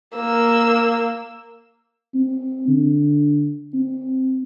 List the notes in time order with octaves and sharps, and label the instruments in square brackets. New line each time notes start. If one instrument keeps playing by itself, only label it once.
[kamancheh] A#3 E6
[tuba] C4
D3
C4